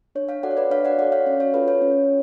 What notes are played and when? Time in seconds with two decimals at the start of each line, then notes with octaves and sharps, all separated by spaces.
0.15 D4 C#5
0.29 C#5 F5
0.43 F#4 A4 D5 F#5
0.51 C#5
0.57 B4 D5
0.70 D4 C#5 F5
0.85 D5 F#5
0.99 F#4 A4 D5 F#5
1.12 C#5 F5
1.26 C#4 C#5
1.40 C#5
1.54 F4 A4 B4
1.68 C#5
1.82 C#4